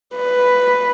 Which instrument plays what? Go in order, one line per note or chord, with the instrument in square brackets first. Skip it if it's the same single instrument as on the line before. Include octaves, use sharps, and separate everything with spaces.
[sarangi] B4